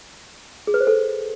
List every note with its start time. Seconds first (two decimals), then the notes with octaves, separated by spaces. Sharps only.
0.67 G#4
0.74 B4
0.80 C5
0.87 A4